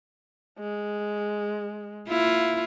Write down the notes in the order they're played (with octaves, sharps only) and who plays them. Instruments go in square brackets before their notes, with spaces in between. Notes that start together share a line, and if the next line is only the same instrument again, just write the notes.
[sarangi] G#3
[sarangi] A#3 [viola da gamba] E4 F4